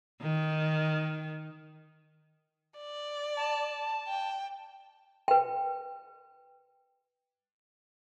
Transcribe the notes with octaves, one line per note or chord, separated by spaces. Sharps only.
D#3
D5
A5
G5
B4 G5